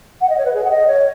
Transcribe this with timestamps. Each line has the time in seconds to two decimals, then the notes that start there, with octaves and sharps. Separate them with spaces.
0.21 F#5
0.29 D#5
0.38 C#5
0.45 B4
0.53 G#4
0.64 F#5
0.71 D#5
0.87 C#5